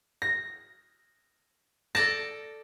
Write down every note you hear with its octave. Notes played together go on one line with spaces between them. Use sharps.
A#6
A4 D5 A5 A#6